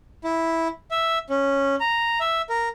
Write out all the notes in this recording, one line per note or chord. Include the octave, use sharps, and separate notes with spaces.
E4
E5
C#4
A#5
E5
A#4